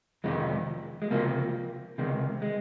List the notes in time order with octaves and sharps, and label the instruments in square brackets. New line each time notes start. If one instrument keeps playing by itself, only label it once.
[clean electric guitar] F2 C3 D#3 G#3
G#3
C#2 C3 F3 A#3
C#2 C3 D#3 G#3
G#3